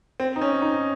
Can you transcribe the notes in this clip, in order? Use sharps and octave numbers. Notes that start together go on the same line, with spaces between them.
C4
D#4
C#4
D#4